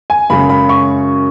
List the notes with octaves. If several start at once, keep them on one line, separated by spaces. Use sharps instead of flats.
G#5
F#2 C#3 G#3 C#4 B5
B5
C#6